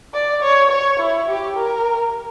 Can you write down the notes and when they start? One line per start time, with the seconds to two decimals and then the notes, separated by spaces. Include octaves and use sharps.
0.14 D5
0.42 C#5
0.71 C#5
0.99 E4
1.28 G4
1.57 A#4